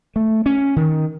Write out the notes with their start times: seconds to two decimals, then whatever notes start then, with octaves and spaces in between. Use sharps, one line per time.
0.16 A3
0.46 C#4
0.76 D#3